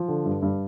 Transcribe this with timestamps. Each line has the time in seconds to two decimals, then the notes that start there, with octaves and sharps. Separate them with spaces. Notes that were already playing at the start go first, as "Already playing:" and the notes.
Already playing: F3
0.08 D3
0.25 G2
0.42 G2